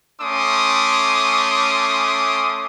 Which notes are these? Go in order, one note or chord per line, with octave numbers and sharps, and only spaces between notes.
A3 C#4 C6 D6 D#6